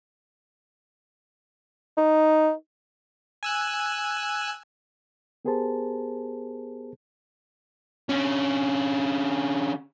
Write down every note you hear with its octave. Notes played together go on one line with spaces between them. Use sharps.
D#4
G#5 E6 F#6
B3 G4 G#4 A#4 C5 A5
D3 C#4